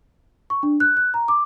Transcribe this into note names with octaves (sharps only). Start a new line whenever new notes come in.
C#6
D4
F#6
F#6
A#5
D6